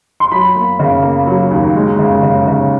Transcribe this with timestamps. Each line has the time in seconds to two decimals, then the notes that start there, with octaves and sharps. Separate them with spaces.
0.20 C6
0.31 F#3 B5
0.56 A#3
0.79 C#3
1.02 A#3
1.27 F#3
1.51 D#2
1.75 G#3
1.99 C#3
2.23 C#3
2.47 C#3